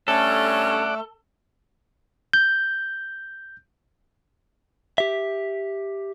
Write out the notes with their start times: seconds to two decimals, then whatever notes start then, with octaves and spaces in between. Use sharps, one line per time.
0.08 G2 A3 C#4 A4 D5 F#5
2.34 G6
4.98 G4 E5